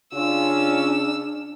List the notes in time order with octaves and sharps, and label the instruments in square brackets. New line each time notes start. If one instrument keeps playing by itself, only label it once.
[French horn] C#3 [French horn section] C#4 F4 [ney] D4 [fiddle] E6